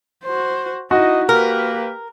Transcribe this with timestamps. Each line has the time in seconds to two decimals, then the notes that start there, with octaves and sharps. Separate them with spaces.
0.24 F#4 C5
0.91 D#4 E4 F#4 D#5
1.29 A#3 G4 A#4 B4